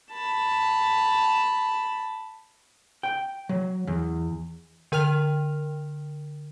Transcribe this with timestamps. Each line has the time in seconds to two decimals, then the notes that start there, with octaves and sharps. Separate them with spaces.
0.11 A5 B5
3.03 G5
3.49 F#3
3.87 E2
4.92 D3 A#4 G5 F6 F7